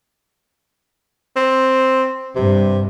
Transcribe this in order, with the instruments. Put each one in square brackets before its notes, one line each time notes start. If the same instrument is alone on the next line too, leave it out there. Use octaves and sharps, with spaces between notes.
[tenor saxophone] C4
[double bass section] G2 [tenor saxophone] C3